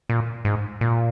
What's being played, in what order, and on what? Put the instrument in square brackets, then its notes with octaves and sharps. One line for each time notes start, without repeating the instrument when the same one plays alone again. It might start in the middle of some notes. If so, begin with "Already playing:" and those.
[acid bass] A#2
G#2
A#2